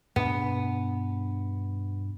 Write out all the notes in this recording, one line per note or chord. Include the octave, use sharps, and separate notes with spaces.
G2 B2 B3 D4